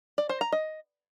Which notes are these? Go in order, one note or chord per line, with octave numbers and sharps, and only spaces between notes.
D5
C5
A#5
D#5